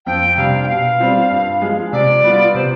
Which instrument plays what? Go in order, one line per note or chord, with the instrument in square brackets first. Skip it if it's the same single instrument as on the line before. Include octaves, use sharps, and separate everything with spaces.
[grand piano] F2 [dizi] G5
[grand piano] C3 G3 D4 [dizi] F5
[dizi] G5
[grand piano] B2 [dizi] F5
[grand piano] G3 C4 F4
G2
F3 G#3
[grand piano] C3 [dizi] D5
[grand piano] G3 B3 F4
[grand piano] C3 [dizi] C5